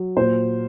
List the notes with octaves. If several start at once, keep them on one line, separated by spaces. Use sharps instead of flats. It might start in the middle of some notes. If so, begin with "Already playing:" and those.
Already playing: F#3
A#2 C5